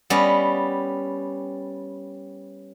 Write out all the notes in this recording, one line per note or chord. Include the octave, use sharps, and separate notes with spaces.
G3 B3 C#4 G4 D#5